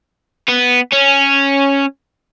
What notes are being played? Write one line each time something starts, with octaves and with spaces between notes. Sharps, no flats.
B3
C#4